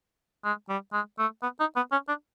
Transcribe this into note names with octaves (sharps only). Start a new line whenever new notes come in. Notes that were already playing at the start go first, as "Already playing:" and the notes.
G#3
G3
G#3
A3
B3
D#4
B3
C#4
D4